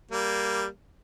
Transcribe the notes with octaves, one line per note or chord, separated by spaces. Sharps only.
G3 A#3